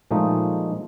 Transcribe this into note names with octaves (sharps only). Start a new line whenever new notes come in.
A#2 F3 G#3 A3 D#4